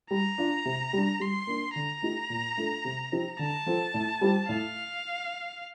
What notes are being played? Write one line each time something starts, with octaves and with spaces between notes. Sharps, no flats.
G3 A#5
D4 F4
C3
G3 D4
G3 C6
A#3 D4
D3 A#5
A3 D#4 G4
A#2
A3 D4 F4 A4
C3
F3 C4 D#4 G4
D3 A5
F3 C4 F4 A4
A2
G3 C4 G4
A2 F5